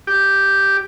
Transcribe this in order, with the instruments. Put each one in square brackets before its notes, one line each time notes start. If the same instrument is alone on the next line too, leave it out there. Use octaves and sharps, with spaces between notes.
[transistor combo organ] G4